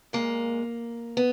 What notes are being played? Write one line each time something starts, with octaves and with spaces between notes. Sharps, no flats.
A#2 G#3 A#3
B3